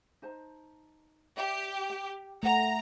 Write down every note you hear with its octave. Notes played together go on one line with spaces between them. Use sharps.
D#4 C5 A5
G4 D5 E5
G5
A3 A#4 F#5 A5 A#5